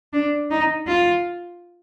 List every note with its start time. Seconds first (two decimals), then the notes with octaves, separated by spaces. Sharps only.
0.13 D4
0.51 D#4
0.87 F4